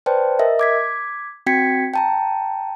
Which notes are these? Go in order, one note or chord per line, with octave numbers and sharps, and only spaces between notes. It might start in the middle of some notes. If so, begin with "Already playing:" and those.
B4 C5 D5 G5 A5
A#4 D#5 E5
D6 G#6 B6
C4 F#4 G5 G#6 B6 C#7
G5 A5 A#5